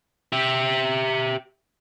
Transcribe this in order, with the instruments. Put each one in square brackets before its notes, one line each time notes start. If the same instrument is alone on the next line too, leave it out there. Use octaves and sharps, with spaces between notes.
[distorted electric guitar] G4 E5